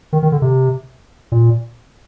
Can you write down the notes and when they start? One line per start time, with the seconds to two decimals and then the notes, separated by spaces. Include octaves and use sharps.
0.13 D#3
0.23 D#3
0.32 D3
0.42 C3
1.32 A#2